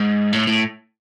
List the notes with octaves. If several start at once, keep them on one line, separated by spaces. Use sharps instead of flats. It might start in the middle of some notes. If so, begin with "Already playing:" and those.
Already playing: G#2
A2
A2